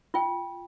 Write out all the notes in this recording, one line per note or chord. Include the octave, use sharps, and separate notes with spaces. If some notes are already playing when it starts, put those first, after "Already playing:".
F4 G5